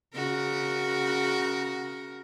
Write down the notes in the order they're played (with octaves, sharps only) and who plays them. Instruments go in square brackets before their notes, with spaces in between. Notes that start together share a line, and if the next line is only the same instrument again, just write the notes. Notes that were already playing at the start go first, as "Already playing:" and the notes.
[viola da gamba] C#3 F#4 A#4